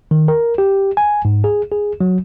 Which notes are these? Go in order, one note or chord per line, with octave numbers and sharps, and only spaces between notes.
D#3
A#4
G4
G#5
G#2
G#4
G#4
F#3